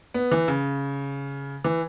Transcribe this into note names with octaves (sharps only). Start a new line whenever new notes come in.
B3
E3
C#3
E3